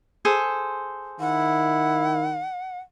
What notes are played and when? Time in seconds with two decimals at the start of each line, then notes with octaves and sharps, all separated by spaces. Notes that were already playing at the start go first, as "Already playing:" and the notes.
0.25 G#4 A4 C5
1.20 D#3 E4 F#5